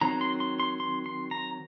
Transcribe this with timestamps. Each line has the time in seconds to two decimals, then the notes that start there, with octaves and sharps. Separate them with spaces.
0.01 D#3 F#3 C4 A#5
0.21 C6
0.40 C6
0.60 C6
0.80 C6
1.06 C6
1.31 A#5